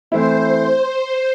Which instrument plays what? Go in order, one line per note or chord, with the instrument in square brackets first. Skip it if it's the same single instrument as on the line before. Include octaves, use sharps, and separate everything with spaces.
[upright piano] E3 A3 C4 E4 [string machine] C5